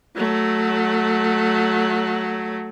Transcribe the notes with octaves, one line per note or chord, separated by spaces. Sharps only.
F#3 A3